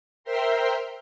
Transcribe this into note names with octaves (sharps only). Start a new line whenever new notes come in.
A#4 C5 E5 G5 A#5 C6